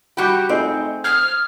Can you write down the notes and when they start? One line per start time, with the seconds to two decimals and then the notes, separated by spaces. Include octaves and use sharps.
0.17 G3 F#4 G4 B5 D6 G6
0.49 A3 C4 D#4 G#4
1.04 D#6 F6 G#6